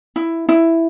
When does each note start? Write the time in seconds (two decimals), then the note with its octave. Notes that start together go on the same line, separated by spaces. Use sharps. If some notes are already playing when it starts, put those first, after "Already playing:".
0.16 E4
0.49 E4